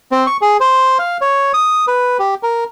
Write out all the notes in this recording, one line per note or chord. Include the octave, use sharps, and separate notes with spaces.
C4
C#6
G#4
C5
F5
C#5
D#6
B4
G4
A#4